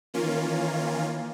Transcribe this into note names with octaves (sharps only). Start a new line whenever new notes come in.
D#3 E3 A#3 C#4 F4